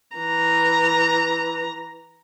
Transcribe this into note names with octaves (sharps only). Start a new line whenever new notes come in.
E3 A#5